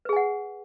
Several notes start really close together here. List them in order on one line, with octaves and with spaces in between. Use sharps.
B4 G#4 G#5 F#5